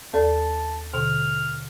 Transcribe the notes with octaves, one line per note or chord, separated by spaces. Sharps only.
D#2 A4 D5 A5
B2 D3 F6